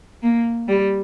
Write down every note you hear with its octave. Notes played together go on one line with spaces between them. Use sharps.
A#3
G3